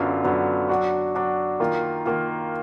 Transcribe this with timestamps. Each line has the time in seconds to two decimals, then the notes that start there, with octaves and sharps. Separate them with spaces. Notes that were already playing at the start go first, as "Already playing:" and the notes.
Already playing: F#2 D3 F#3 B3 F4
0.24 F#2 D3 F#3 B3 F4
0.69 F#3 D4 F#4
1.15 F#3 D4 F#4
1.60 D#3 A#3 F4
2.05 D#3 A#3 F4